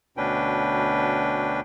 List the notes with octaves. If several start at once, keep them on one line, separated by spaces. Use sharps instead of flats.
D2 B2 C#4 D4 B4 G5